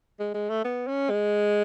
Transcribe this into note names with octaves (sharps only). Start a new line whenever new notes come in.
G#3
G#3
A3
B3
C#4
G#3